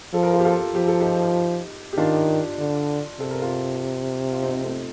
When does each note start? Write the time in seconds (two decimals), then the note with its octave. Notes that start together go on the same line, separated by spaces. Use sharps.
0.14 F3 A4
0.23 A#4
0.33 F4 A4
0.40 G4
0.45 F4 A4
0.75 F3 G4
0.88 A4
1.00 D#4 G4
1.93 G4
1.97 D#3 D4 F4
2.59 D3
3.20 C3 A4
3.31 A#4
3.42 F4 A4
4.32 F4
4.43 C4 D#4
4.63 A3 C4